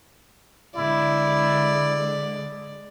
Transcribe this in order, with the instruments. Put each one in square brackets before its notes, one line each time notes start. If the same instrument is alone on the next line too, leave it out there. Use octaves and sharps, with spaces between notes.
[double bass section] D3 G#3 [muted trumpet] E4 [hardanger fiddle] D5